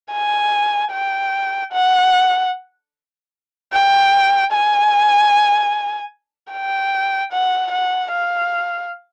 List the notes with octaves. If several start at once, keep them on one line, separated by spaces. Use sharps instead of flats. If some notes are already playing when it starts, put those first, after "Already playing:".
G#5
G5
F#5
G5
G#5
G5
F#5
F#5
F5